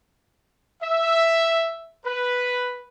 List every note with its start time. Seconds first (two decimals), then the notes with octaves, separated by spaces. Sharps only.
0.82 E5
2.05 B4